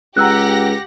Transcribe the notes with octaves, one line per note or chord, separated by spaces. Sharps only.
C#2 G4 F#5 A#5 E6 F#6 A#6